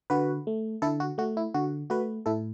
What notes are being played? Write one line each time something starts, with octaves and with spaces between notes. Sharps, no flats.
D3 F#4 B4
A3
D3 E4 A4
F#4
A3 F#4
E4
D3 F#4
A3 F#4 B4
A2 E4 A4